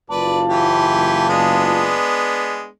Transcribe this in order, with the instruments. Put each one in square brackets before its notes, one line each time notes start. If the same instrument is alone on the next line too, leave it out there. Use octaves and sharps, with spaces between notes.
[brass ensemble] F#1 F4 A5 [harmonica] B4 D5
[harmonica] E3 G4
G#3 B3 D4